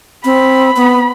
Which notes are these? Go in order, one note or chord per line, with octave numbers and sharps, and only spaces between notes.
C4 B5
B3